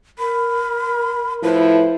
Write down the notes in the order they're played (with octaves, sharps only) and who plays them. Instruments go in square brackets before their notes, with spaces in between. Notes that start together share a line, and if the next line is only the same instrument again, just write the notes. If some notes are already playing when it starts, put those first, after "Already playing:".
[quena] A#4 [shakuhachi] B5
[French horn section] A2 F3 E4 [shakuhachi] B4